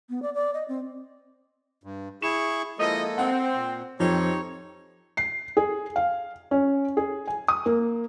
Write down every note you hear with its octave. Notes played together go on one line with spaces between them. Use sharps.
B3
D5
D5
D#5
C4
G2
E4 G#4 C#6 E7
F3 G#3 A#3 E4 A4 D#5
C4 F#5
A#2
F2 C4 D#4 G4 C#5
C7
G#4
F5
C#4
G#4
G#5
D#6
A#3